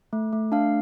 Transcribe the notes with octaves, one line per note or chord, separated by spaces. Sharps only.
A3
A3
D4 F5